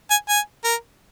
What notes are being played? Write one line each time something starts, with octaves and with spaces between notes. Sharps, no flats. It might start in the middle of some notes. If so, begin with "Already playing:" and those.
G#5
G#5
A#4